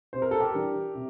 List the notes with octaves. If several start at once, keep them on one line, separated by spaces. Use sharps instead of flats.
C3 C5
A#4
A4
G4 A#4
E3 G3 D4
C3